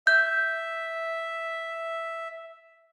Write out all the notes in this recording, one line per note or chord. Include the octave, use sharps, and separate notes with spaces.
E5 G6